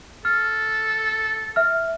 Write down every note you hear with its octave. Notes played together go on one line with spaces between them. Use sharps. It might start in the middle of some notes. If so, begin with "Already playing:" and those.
A4 F6
E5 F6